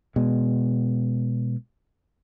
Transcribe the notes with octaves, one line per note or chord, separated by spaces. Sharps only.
B2 G#3